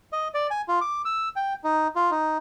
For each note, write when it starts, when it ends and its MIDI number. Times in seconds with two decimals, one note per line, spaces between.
0.13 0.28 75
0.34 0.47 74
0.51 0.62 80
0.68 0.80 65
0.81 1.02 86
1.05 1.29 88
1.36 1.54 79
1.64 1.88 63
1.96 2.11 65
2.11 2.38 63